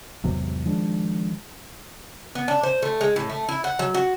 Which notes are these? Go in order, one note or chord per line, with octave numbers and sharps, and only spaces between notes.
G#1 E2 C3 F#3
D#3 F3 G#3 D4
B3
D4
C5
A3
G#3
A2
A3
E4
F#5
F#3
F#4